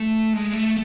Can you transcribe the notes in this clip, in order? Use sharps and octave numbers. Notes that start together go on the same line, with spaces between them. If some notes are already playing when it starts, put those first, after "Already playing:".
Already playing: A3
G#3
A3